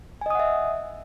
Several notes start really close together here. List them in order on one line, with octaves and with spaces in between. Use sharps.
G#5 D#5 D#6 F#5 E5